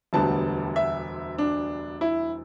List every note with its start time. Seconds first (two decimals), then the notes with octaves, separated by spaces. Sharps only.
0.13 E1 D2 D3 G3 B3 A5
0.76 E5
1.38 D4
2.01 E4